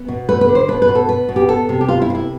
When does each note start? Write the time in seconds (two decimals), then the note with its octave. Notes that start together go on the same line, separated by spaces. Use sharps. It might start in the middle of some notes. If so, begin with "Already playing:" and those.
Already playing: B3
0.08 B2
0.29 A3 B4
0.41 B4
0.49 D3
0.55 C5
0.68 B2 B4
0.82 B4
0.88 B2
0.95 A4
1.09 B2 B4
1.29 B2
1.36 G4
1.48 B3 A4
1.69 C3
1.81 G4
1.88 B3 F4
2.02 E4
2.09 C3 F4
2.15 E4